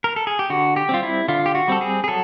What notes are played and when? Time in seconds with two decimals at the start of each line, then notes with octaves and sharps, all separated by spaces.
0.04 A#4
0.16 A4
0.27 G#4
0.39 G4
0.50 D3 F#4
0.76 G4
0.89 G3 C4 F4
1.03 E4
1.28 D3 F4
1.46 G4
1.55 F#4
1.68 G3 C4 A4
1.81 G#4
2.04 G#4
2.08 F#3 A4